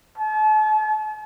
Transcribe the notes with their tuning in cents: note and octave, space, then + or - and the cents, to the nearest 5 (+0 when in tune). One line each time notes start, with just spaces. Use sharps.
A5 -40